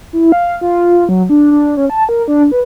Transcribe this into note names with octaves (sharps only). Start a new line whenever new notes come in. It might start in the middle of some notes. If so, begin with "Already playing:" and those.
E4
F5
F4
F#3
D4
D4
C#4
A5
A#4
D4
B4